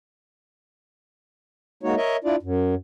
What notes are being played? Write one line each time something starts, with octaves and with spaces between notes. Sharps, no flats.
G#3 A#3 D#4 F#4 C#5
A#4 C#5 D#5 E5
D4 E4 F4 D5
F#2